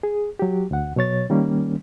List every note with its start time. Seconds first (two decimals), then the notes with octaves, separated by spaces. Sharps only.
0.03 G#4
0.39 F#3 G4
0.71 D2 F#5
0.96 B2 F#3 C#5 A6
1.30 D#3 G3 A#3 C#4